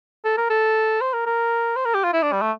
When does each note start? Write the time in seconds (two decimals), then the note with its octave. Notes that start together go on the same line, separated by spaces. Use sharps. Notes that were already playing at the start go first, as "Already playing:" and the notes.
0.25 A4
0.37 A#4
0.50 A4
1.01 C5
1.13 A#4
1.26 A#4
1.76 C5
1.85 A#4
1.94 G4
2.04 F4
2.13 E4
2.22 D4
2.32 G3
2.41 A3